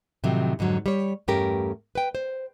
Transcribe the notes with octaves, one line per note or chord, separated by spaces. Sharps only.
A2 C3 D#3 F3 F#3
F2 G#2 D3 F#3
G3 C#5
E2 G2 A3 C#4 G4 A#4
B4 G5
C5